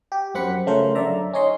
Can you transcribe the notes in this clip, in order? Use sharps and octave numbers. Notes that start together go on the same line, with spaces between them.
G4
F#2 C4 G4 F#5 B5 C#7
C#3 A3 F4 A#4 C5
F#2 D3 D5 E5 A#5
C#4 D#4 C#5 D#5 C6